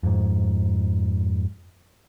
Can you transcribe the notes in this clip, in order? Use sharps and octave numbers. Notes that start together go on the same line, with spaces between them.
F2 G#2